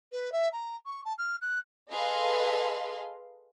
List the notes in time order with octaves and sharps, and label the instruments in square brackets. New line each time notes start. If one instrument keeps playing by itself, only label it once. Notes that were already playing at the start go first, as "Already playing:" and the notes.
[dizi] B4
E5
A#5
C#6
A5
F6
F#6
[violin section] G#4 A4 B4 D#5 F5 C6